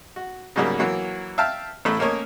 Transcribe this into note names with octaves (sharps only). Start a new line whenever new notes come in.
F#4
G#2 C#3 F#3 G3 A#3
E3 F#3 A#3 F#4
E5 F5 G5 A5 F6
A1 A2 A3 B5 E6
A3 A#3 C#4 A#4 C#5 D#5